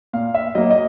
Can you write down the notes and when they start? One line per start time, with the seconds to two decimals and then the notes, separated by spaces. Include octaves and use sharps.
0.13 A#2 F5
0.34 E5
0.55 F#3 A#3 D#5
0.71 D#5